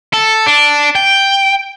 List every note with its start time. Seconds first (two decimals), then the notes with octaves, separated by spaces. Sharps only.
0.13 A4
0.46 D4
0.95 G5